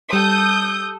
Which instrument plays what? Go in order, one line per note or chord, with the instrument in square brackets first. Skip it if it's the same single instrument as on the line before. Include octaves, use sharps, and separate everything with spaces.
[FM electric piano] G3 [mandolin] A4 [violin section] D#6 G6